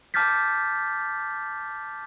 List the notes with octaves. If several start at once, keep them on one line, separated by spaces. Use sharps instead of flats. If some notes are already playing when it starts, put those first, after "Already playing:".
A5 D6 F6 G6 A6 B6